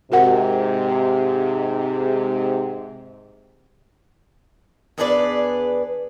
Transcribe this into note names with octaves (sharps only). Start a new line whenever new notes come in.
G#2 C3 F#4 A#4 F#5
E2 B3 D4 G#4 B4 D5